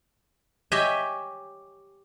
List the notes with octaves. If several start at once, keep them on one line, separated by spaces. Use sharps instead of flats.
G4 C#5 D#5 E5 G#5